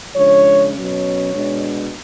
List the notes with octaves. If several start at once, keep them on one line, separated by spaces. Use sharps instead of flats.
C#3 F3 G#3 D4 C#5
B2 F#3 C#4 C#5
B2 G#3 D4